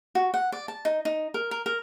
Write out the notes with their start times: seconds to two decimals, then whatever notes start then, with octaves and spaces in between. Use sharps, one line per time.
0.15 F#4
0.34 F#5
0.52 D5
0.68 A5
0.85 D#4
1.05 D#4
1.34 A#4
1.51 A#4
1.66 A#4